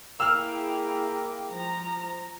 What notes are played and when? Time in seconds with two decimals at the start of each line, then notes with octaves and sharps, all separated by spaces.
0.20 A#3 E4 G#4 G5 E6 F6
1.50 F3 A#5